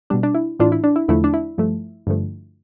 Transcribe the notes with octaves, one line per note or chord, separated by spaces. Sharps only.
B2 G3 D4
D4
E4
A2 E3 A3 D4 F4
E4
D4
E4
E2 D3 F3 A3 E4
D4
E4
G2 F3 A3
G2 D3 F3 A3